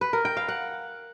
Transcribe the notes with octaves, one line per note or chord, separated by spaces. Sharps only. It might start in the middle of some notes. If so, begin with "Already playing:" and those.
B4
A#4
G5
F5
F#5